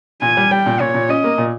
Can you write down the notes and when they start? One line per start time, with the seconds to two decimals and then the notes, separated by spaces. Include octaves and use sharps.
0.22 A#2 G#5
0.37 G3
0.51 G3 G5
0.66 A#2
0.80 A#2 C#5
0.94 A#2
1.09 C#4 D#5
1.24 A#3
1.38 A#2